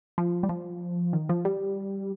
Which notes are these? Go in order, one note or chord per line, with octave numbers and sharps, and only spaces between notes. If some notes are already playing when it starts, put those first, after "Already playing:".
F3
G3
F3
D#3
F3
G3